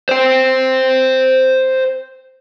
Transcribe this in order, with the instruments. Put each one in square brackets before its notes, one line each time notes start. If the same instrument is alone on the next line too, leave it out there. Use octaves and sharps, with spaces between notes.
[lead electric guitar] C5 G5